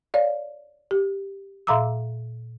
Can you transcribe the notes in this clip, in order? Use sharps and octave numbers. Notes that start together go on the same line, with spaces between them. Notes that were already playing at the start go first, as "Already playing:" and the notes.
C#5 D5 F5
G4
A#2 E5 F5 A#5 D6 E6